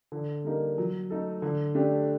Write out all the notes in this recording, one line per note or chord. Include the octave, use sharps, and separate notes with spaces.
D3
G3 A#3 D#4
F#3
A3 D#4 A4
D3
A3 D4 G4